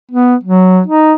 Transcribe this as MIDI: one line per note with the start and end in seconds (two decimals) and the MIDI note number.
0.11 0.35 59
0.44 0.81 54
0.87 1.14 63